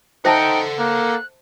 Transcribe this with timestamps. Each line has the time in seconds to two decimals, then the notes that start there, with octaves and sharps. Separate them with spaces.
0.25 D#4 A4 C5 E5 F#5 G5 A5
0.79 A#3 F#6